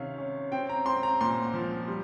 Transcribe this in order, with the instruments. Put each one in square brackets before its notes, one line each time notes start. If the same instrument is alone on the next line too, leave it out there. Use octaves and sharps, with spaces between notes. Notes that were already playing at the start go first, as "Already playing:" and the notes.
Already playing: [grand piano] C3 D#3 C#4 F5
C#4
C4 G5
A#5
C4 C6
A#5
A#2 C6
F3
G3